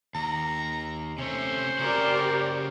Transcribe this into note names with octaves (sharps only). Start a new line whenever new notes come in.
D#2 A#5
C3 A3 C#4 C5
C#3 F#4 G4 A#4 D5